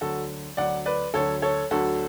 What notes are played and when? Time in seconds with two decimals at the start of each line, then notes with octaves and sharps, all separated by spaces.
0.01 D2 D3 F#3 F#4 A4
0.57 D2 D3 F#3 D5 F#5
0.86 B4 D5
1.14 D2 D3 F#3 A4 C#5
1.42 A4 C#5
1.71 D2 D3 F#3 F#4 A4